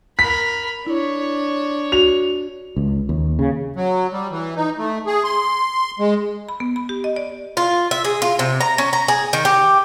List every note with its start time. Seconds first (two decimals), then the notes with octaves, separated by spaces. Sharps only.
0.19 A#4 B5 B6
0.87 D4 E4 C#5
1.92 F#4 F7
2.76 C#2
3.09 D#2
3.39 C#3
3.76 F#3
4.12 G3
4.31 E3
4.56 D#4
4.78 A3
5.06 G#4
5.24 C6
5.99 G#3
6.49 B5
6.60 B3
6.76 B5
6.89 G4
7.04 D#5
7.16 D5
7.57 F4
7.91 E5
8.05 G#4
8.22 F4
8.39 C3
8.61 A#5
8.78 C#4
8.93 A#5
9.08 G#4
9.33 D#3
9.45 G4